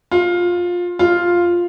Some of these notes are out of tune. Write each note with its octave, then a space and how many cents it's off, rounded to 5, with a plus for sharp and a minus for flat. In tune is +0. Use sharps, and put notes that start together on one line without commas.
F4 +15
F4 +0